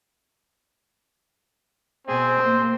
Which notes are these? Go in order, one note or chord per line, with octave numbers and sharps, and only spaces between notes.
B2 C4 G#4
A#3 C5